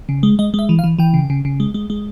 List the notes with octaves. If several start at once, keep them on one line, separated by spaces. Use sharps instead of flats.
C#3
G#3
G#3 D#5
G#3
E5
E3
F5
E3
E3 G5
C#3
C#3
C#3
G#3
G#3
G#3